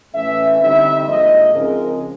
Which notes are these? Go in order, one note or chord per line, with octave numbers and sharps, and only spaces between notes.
A2 E3 A3 C#4 E5
D3 G3 C4 D#4 E5
G#2 F3 A#3 D#5
C#3 F3 G#3 C4 D#4 A#4